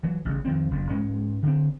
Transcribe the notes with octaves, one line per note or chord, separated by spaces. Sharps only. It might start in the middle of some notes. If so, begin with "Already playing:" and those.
E3 F#3
A1 C#3
F2 D#3 C4
F#1 F2
G#2 G#3 C#4
D3 C4